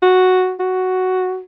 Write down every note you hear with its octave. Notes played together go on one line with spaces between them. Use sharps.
F#4
F#4